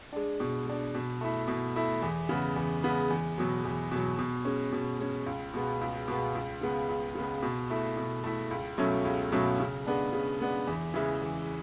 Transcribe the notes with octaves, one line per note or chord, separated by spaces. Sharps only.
G#3 D4
B2
G#3 D4
B2
A3 E4
B2
A3 E4
E2
C#3 G#3 B3
E2
C#3 G#3 B3
E2
B2 F#3
E2
B2 F#3
B2
G#3 C#4
B2
G#3 C#4
C#2
B2 G#3 B3
C#2
B2 G#3 B3
C#2
C#3 G#3 B3
C#2
C#3 G#3 B3
B2
A3 E4
B2
A3 E4
C#2
B2 F#3 A3 C#4
C#2
B2 F#3 A3 C#4
C#3
G#3 B3 D4
C#3
G#3 B3 D4
E2
C#3 E3 G#3
E2